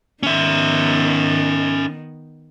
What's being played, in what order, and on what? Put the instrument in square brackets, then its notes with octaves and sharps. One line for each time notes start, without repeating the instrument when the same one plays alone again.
[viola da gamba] D#3 B3 [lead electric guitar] C#4 E5